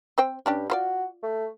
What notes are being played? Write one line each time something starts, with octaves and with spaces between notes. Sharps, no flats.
C4 C5 G5
G2 C#4 D4 G4
F4 F#4 C5 D5
A3